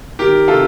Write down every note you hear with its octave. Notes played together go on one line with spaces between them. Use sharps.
D#3 G4 A#4
C3 F4 A4